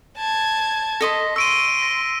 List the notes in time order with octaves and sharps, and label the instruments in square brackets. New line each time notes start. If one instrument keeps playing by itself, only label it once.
[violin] A5 G#6
[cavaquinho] A4 D#5 C6 [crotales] A#6 B6
[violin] C6 [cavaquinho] C#6 [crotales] E6 D7 D#7
[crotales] A#6